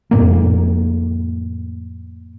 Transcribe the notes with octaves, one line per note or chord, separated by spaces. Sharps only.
F2 A2 A#3